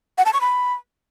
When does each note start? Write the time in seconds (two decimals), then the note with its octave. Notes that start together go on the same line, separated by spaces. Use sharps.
0.18 F#5
0.26 A5
0.33 C#6
0.41 B5